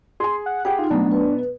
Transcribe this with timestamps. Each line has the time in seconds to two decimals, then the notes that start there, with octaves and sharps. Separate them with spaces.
0.20 G#4 G#5 C6
0.46 F#5
0.65 G4 G#4 F#5 G5 B5
0.79 D#4 F4
0.90 B2 F#3 A3 B3 D4 A#5
1.11 B4